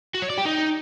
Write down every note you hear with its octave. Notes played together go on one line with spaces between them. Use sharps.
F#4
C#5
D5
G4
D#4